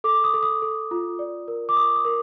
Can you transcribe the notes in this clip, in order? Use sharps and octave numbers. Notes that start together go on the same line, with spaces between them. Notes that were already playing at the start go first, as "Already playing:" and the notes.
A4 D6
D#6
A4
D#6
A4
F4
D5
A#4
D6
A#4 D#6
D#6
A#4